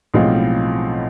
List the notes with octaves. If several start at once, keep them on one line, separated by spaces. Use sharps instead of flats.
B1 A2 F3 G#3 C4